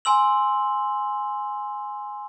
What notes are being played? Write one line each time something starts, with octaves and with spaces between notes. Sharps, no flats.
G#5 C6 E6 F#7